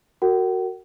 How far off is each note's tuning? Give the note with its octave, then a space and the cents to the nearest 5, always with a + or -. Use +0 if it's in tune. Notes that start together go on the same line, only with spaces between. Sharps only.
F#4 +5 A#4 -30 F#5 +45